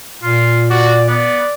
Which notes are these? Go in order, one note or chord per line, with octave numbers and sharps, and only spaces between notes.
A#2 F4
F#4 D5
B3 D5